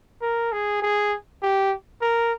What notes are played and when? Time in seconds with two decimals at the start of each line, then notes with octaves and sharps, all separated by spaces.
0.22 A#4
0.52 G#4
0.82 G#4
1.42 G4
2.01 A#4